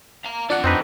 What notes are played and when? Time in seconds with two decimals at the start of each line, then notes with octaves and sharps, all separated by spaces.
0.24 F5 A#5
0.50 D4 F4 A4 D5 F#5
0.64 F2 C4 D#4 B4